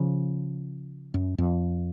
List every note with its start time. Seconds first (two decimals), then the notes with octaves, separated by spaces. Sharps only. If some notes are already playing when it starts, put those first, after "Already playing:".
Already playing: C#3 F3
1.14 F#2
1.38 F2